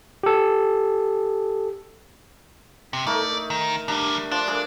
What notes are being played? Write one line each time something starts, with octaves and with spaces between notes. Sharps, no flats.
G4 A4
C3
A3 D#4 A#4 D5
D#3
D#3 G3 D4 G4
F3 D4
G#4 A#4 D5